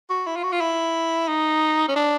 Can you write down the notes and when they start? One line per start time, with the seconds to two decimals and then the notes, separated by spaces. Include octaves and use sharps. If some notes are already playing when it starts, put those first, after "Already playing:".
0.10 F#4
0.27 E4
0.36 F4
0.44 F#4
0.53 F4
0.61 E4
1.28 D#4
1.88 C#4
1.96 D4